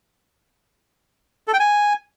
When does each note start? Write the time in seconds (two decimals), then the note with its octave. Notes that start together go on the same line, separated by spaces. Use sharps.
1.48 A4
1.54 G5
1.59 G#5